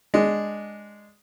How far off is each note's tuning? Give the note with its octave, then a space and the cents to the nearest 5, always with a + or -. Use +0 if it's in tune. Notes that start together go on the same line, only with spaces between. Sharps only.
G#3 -5 D4 +0